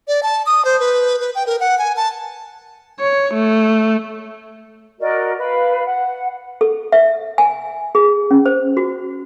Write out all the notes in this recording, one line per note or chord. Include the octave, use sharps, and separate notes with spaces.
D5
A5
D#6
C5
B4
B4
G5
A#4
F#5
G#5
A5
C#5
A3
F#4 A#4 D5 D#5
B4 F5 B5
F#5
A4
E5
G#5
G#4
C#4
C5
F#4